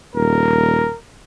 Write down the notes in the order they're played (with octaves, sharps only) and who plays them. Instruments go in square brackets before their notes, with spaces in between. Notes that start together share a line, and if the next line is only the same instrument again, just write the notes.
[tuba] D#1 [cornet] A#4